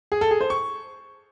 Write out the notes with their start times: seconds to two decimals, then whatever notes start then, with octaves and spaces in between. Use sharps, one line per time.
0.12 G#4
0.21 A4
0.31 G#4
0.40 C5
0.50 C#6